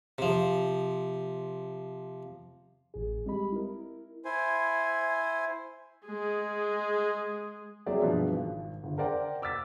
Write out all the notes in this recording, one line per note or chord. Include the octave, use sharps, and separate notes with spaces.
C3 F3
A1 G#4
G3 G#3 C4 G4 D#5 B5
E4 A#4
E4 C5 G#5
G#3 G#4
F#3 C4 G#4 D5 E5
G2 B2 E3 F3 G#3 B3
G#1
G1
A#4 C5 D5 F#5 G5
D6 E6 F6 A6 B6